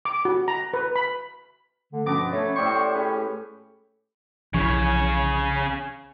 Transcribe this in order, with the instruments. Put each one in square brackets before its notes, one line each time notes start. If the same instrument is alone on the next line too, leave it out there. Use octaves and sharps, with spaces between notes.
[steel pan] D6
F#4
A#5
B4
B5
[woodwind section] D3 [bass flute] A3
[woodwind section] G2 B2 F3 [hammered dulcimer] B3 A#5 [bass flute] C#4 [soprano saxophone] D6
[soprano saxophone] A3 [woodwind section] C#5
[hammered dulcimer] A2 G4 C5 [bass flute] D5 [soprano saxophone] C#6
[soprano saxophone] C#4 [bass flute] G#4 [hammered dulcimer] B4
[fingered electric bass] B1 E3 F3 [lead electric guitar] C#3 C#5